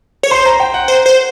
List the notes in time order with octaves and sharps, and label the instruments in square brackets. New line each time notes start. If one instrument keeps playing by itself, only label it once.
[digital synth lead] C#5
[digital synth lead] C5 [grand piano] C6
[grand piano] A#5
G5
F#5
[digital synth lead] C5
C5